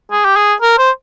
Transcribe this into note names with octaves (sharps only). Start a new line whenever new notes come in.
G#4
G4
G#4
A#4
C5